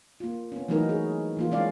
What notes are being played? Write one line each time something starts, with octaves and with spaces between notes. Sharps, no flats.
A#3 F4
B3 C#4
E3 F#3 A3 B3 D#4 A#4
G#4 C#5
E3 A#3 F4
G#3 C#4 D5 F5